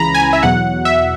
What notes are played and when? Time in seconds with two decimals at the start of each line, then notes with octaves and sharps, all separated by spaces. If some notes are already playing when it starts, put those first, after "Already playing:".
Already playing: C#2 C#3 E3 A#5 B5
0.14 G#5
0.33 E5
0.43 E2 B2 F#3 F#5
0.85 E5